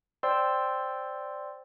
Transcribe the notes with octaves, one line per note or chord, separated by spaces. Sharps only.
C5 D5 G5 C6 E6